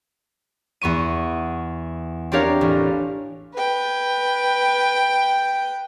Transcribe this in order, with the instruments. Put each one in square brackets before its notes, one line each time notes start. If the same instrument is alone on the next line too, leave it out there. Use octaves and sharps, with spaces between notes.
[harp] E2 B3 C#6 D#7
C4 D4 G4 A#4 C#5 F5
A1
[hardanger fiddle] B4 G5